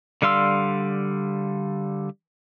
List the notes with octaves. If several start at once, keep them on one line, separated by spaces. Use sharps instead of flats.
D3 G3 F5 C6 E6